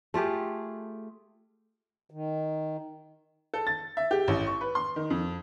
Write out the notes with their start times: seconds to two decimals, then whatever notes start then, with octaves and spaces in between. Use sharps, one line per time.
0.14 A3 F4 G4 G#4
2.10 D#3
3.54 A4
3.67 A6
3.97 E5
4.11 G4
4.28 A1
4.47 C#6
4.61 B4
4.75 C6
4.96 D#3
5.10 F2